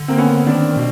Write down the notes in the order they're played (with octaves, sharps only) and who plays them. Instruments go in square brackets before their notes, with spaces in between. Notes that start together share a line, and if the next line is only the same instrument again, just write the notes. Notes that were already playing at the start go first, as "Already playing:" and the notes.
Already playing: [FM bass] D3
[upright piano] A#3 C4
B3 C#4
[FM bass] D#3 [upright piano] C4 D4
[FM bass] B2